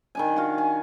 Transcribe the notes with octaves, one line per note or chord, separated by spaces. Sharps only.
D#3 D4 G#5
F#4 F5
G#5